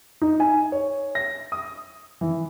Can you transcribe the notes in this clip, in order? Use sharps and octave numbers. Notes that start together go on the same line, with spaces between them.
D#4
G#5
C#5
A#6
D#6
E3